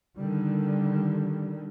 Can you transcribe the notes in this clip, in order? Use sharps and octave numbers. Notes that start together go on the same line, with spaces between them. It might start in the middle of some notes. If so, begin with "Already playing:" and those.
D3 D#3 G3